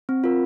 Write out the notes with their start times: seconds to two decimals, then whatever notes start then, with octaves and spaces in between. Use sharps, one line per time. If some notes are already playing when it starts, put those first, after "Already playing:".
0.09 C4
0.24 F4 A#4